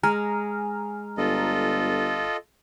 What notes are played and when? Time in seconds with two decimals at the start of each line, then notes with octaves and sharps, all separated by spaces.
0.03 G#3 G#5 A#5 F6
1.17 G1 F4 A4 D#5